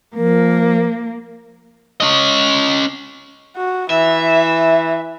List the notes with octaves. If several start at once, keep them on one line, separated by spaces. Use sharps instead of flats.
F3 A#3 A#4
C#4 D#5
F#4
E3 E5